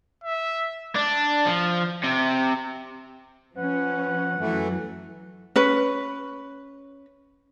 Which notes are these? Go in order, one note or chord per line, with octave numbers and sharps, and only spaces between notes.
E5
D4
F3
C3
F3 C#4 B4 F#5
F#2 E3 F#3 A3
C#4 B4